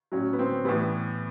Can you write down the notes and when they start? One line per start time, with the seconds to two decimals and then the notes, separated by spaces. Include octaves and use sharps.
0.12 A2 F#3 C#4
0.33 B3
0.39 C4
0.65 A2 E3 G3 B3